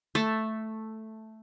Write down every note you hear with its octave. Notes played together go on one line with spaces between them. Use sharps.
A3